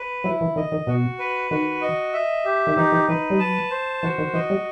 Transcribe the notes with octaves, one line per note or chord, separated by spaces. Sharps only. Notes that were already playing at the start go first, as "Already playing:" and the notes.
Already playing: B4
F#3 E4
E3
D#3 D#5
D#3
B2 F#4
B4
D#3 F#4
D#5
E5
G4
D#3
E3 D#4
E3
E3 B4
G3
F#3 A5
C5
E3 F#4
D#3
E3 D#5
G3